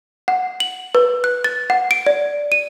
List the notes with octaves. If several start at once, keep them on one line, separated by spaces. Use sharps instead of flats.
F#5
F#7
B4
F#6
A6
F#5
D7
D5
D#7